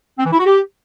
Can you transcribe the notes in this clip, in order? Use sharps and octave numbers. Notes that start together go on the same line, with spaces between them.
C4
E3
E4
F#4
G4